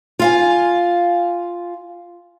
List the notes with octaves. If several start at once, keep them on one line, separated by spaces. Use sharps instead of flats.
F4 F5 G#5